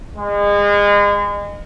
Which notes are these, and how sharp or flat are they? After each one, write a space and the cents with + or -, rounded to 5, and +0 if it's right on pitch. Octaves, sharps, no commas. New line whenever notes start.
G#3 -30